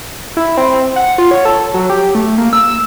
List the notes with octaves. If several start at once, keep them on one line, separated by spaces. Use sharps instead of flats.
E4
C4
F#5
F4
C#5
A4
F#3
G4
A3
A#3
E6